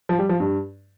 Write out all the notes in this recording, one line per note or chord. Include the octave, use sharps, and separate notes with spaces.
F3
G3
F3
G2